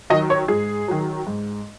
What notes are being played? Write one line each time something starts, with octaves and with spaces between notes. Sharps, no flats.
D#3 F#3 D#5
C#5
G#2 G#4
D#3 F#3
G#2